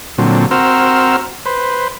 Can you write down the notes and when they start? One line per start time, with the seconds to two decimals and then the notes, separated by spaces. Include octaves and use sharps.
0.18 A#2 D3 F#3 C4
0.51 C4 F#4 A#4 C5 E6 F6
1.46 B4 C5